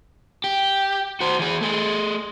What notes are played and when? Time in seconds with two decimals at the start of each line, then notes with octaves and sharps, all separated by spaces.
0.44 G4
1.20 F#4 C5
1.39 E3 G#4
1.61 A3 G#4